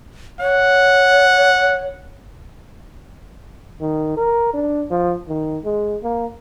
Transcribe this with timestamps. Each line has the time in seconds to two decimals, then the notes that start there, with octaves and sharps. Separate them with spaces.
0.40 C#5 F#5
3.81 D#3
4.17 A#4
4.54 D4
4.90 F3
5.28 D#3
5.65 G#3
6.03 A#3